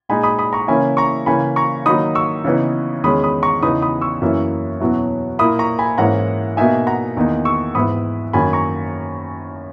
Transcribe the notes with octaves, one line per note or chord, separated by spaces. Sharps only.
A#2 G#3 D#4 G#5 B5
B5 D#6
B5 D#6
A#5 C#6
C#3 E3 A#3 C#4 E4 G#5 B5
A#5 C#6
C#3 E3 A#3 G#5 B5
A#5 C#6
D#3 F#3 A#3 D#4 B5 D#6
C#6 E6
C#3 E3 B3 D#4
E2 D#3 G#3 C#4 B5 D#6
B5 D#6
A#5 C#6
E2 C#3 E3 B3 D#4 B5 D#6
B5 D#6
C#6 E6
F#2 E3 A#3 C#4 E4
E2 B2 F#3 C#4 E4
A#2 A#3 E4 B5 D#6
A#5 C#6
G#5 B5
G#2 E3 A#3 C#4 E4 F#5 A#5
B2 A#3 D#4 E5 G#5
F#5 A#5
E2 D#3 A#3 D#4
C#6 E6
G#2 E3 B3 E4 B5 D#6
F#2 D#3 A#3 G#5 B5
A#5 C#6